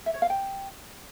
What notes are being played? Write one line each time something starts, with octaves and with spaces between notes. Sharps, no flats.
E5
C#5
F5
G5